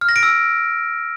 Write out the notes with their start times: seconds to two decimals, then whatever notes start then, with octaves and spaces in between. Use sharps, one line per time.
0.01 F6
0.09 A#6
0.16 D7
0.23 E6